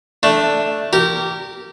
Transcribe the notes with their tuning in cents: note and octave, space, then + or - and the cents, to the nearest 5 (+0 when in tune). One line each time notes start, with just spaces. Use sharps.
A3 +0 D4 +0
G4 -20 A#4 -25